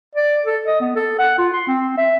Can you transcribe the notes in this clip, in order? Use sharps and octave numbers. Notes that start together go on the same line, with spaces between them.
D5
A4
D#5
B3
A4
F#5
F4
C6
C4
E5